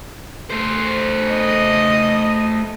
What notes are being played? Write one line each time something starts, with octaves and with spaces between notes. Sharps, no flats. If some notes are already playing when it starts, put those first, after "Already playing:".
A3 C5
D#5